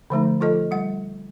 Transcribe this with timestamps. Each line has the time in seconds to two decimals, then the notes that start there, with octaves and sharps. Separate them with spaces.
0.10 D3 F3 A3 D#4
0.40 F3 F4 A4 D#5
0.71 G3 F#5